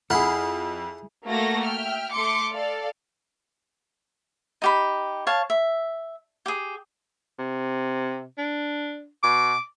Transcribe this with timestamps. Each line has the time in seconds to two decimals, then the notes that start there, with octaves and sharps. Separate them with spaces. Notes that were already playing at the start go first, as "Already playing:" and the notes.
0.10 F2 E4 G#4 A4 F#5 B5 C6 F6
1.27 A3 A#3 F#4 A4 F5 A#6
1.64 E5 G5 F6
2.13 A3 C6 D6 C#7
2.52 A4 D5 F5
4.62 D#4 G4 B5
5.27 C#5 F5 A5
5.50 E5
6.46 G4 G#4
7.39 C3
8.38 D4
9.23 B2 D6